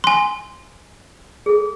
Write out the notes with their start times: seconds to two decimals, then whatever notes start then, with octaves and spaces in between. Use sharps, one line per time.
0.04 G#5 C6
1.46 G#4 A4